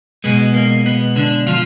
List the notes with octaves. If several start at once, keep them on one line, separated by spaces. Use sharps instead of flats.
B2 G#3 B3
A#3
B3
D3 D4
F3 F4